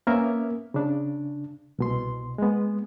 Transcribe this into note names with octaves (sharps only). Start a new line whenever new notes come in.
A#3 B3 C#4 A#4 E5
C#3 D4
C2 B2 C6
G#3 B3